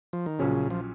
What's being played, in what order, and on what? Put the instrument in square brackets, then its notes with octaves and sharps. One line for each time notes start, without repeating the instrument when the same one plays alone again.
[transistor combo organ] F3
D#3
[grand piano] A#1 A#2 F#3 C#4 [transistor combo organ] C#3
[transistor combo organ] F3